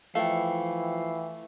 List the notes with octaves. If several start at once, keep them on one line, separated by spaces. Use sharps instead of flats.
E3 F3 A3 F5 G5